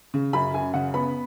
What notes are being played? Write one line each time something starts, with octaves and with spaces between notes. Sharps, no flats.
C#3
F#2 B5
F#2 G#5
C#3 F#5
B3 B5